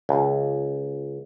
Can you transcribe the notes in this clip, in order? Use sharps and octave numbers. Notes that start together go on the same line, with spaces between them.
C#2